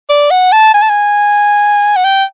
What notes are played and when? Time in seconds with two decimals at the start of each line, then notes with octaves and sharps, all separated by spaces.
0.09 D5
0.31 F#5
0.52 A5
0.74 G#5
0.82 A5
0.89 G#5
1.96 F#5
2.05 G5